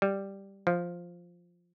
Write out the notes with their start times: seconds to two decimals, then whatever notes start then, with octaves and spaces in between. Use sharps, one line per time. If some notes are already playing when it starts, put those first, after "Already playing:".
0.02 G3
0.67 F3